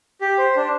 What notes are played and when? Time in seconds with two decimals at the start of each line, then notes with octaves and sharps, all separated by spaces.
0.21 G4
0.38 C5
0.56 D4